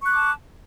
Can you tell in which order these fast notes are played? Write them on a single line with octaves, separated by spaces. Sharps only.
C#6 F#6 D6 A5